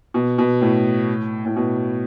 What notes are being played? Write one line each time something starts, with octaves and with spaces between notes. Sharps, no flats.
B2
B2
A2
A2
B2